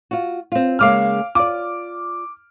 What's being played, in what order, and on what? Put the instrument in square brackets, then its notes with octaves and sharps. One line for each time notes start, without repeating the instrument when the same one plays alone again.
[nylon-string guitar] F4 F#4
C4 F4
[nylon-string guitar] C#3 G#3 A#3 [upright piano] F5 D6 F6
[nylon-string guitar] F4 D5 [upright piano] D6